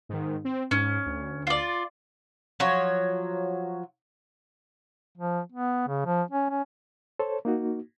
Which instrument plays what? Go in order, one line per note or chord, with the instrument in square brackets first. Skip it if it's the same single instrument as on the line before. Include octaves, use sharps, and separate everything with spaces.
[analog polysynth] G#2 D#3
C4
[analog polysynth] G#2 [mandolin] C#4
[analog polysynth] D2
[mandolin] F4 D5
[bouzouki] F3 F#3 C#5
[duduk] F3
B3
C#3
F3
C#4
C#4
[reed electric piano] A4 C5 C#5
A#3 D#4 F#4